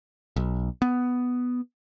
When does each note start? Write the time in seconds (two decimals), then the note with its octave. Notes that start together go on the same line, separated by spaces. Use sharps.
0.36 B1
0.82 B3